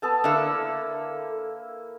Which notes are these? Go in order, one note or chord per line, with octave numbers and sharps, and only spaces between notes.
B3 A4 A5
D3 A#3 E4 A4